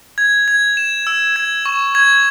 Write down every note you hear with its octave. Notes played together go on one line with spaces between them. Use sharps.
G#6
G#6
E7
E6
G#6
C#6
G#6